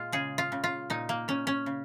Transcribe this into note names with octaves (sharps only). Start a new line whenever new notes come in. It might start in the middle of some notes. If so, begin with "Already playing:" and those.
Already playing: A#2 G#3 F4
C#3 G#4
F4
C#3
F4
A#2 D#4
A#3
A#2 C#4
C#4
C#3